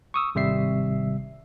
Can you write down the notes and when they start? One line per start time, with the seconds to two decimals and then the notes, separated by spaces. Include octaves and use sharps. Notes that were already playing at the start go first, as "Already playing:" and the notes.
0.14 C#6 D#6 E6
0.35 G#1 C3 G3 E5 C7